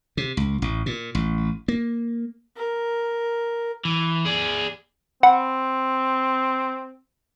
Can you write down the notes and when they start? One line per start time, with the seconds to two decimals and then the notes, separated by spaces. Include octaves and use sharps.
0.17 C3
0.37 C#2
0.62 A1
0.86 A#2
1.15 A1
1.68 A#3
2.56 A#4
3.85 E3
4.25 G#4 D5
5.23 C4 F#5 B5